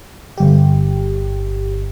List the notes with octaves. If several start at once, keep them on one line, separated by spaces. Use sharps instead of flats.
G1 G4